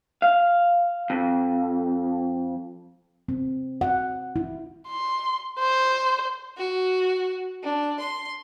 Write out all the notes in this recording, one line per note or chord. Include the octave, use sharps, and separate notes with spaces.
F5
F2
C4
F#5
E4
C6
C5
F#4
D4
C6